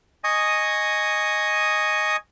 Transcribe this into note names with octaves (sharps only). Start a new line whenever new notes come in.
D#5 G#5 C#6 D#6